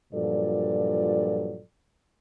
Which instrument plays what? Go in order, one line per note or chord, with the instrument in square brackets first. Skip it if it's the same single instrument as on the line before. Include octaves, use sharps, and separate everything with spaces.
[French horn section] G2 A#2 F3 F#3 A4 D5